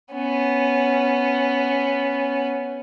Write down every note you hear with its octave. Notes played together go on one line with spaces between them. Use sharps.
B3 C#4